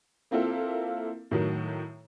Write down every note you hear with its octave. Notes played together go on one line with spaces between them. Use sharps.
A#3 C4 E4 F4 A4
A2 D#3 F#3